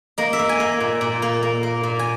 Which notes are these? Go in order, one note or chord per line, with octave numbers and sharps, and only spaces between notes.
A#3 D#5
E5
A#3
G#5
A#3
A#2
A#2
A#3
A#3
A#3
A#2
G#5